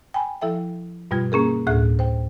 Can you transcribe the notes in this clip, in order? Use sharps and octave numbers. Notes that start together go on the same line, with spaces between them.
G5 G#5 B5
F3 E4 A4 E5 G5
G2 B2 G3 F4 G#6
A#3 C#4 G#4 A#4
D2 A2 G#4 E5 F#6
C5 G5